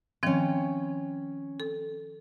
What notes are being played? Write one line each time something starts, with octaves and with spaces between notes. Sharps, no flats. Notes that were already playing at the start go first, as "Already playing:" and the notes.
D#3 F3 C4 C#4 G5
A4